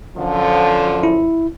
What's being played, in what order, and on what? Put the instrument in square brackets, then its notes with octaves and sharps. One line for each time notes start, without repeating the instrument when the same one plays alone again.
[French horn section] F#2 D3 F3
[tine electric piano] E4